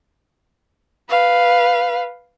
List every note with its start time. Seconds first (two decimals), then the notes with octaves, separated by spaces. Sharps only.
1.10 B4 F5